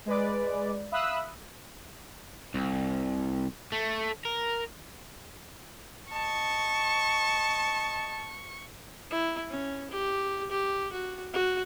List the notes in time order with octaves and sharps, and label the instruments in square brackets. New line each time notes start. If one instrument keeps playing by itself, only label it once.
[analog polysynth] G#3 B4 D5
E5 F5 B5 D#6 E6 F#6
[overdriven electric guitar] C2
A3
A#4
[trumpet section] D#5 A5 [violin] C#6
[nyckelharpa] E4
C#4
G4
G4
F#4
F#4